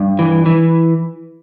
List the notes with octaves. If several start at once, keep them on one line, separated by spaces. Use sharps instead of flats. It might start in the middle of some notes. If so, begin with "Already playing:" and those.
Already playing: G2
E3
E3